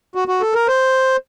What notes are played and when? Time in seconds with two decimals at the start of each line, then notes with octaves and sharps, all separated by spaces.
0.15 F#4
0.28 F#4
0.41 A4
0.54 A#4
0.68 C5